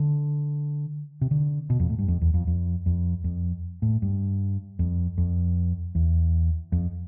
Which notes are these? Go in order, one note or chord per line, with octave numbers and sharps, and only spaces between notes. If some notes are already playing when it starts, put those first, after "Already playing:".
Already playing: D3
C3
D3
B2
F2
A2
G2
F2
E2
F2
F2
F2
F2
A2
G2
F2
F2
E2
F2